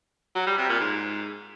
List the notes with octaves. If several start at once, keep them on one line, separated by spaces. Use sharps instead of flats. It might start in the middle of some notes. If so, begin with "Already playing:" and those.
F#3
G3
C3
A#2
G#2